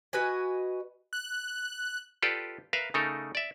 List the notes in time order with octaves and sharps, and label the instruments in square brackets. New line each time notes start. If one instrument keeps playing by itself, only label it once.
[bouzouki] F#4 B4 D#5 G#5
[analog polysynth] F#6
[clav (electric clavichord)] F4 G4 A4 B4 D5
A#4 B4 E5 F5
C#3 A3 D#4 A4 A#4
D5 E5